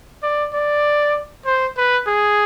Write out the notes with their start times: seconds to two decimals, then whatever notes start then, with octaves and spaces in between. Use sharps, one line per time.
0.23 D5
0.54 D5
1.45 C5
1.77 B4
2.07 G#4